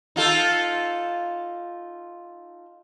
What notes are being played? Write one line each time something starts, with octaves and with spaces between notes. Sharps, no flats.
D#4 F4 A4